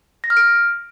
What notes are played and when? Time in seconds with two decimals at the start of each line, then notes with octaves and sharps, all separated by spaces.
0.24 A#6
0.30 F6
0.37 D7